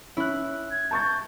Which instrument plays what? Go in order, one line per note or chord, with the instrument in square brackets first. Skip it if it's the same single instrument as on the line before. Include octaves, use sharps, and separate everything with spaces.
[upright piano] C#4 [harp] E4 F#6
[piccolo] G#6
[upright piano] A5 C#6 A6 [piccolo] G6